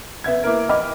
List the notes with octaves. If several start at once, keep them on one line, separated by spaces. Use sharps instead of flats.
B3 E5 G#6
A#3 E4 A#4
D#5 G5 B5 D6 F6